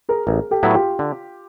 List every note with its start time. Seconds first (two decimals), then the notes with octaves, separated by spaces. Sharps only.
0.09 G#4 A#4
0.27 A1 G#4 A#4
0.51 G4 A4
0.63 A2 F#3 B3 E4
0.75 F4 G4
0.99 D3